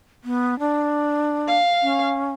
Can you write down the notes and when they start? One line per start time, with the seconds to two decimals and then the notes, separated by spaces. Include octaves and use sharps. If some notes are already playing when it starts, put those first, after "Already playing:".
0.24 B3
0.59 D4
1.48 F5
1.83 C#4